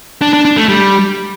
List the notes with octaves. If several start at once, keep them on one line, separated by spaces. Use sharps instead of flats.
D4
D4
D4
A3
G3